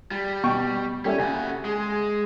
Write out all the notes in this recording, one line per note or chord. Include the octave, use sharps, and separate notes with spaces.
G3
B2 G5 C#6
G3 C#4 A4 E5
C#3 F#4 G#5
G#3